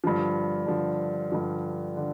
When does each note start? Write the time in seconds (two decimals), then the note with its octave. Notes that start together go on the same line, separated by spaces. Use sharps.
0.04 G2 D3 F3
0.67 G2 D3 F3
1.32 G2 D3 F3
1.97 D3